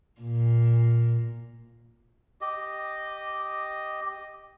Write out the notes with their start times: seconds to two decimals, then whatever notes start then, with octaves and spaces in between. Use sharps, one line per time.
0.21 A#2
2.41 G4 D#5